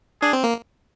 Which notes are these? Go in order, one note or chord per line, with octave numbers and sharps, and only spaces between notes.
D4 G#4
C4
A#3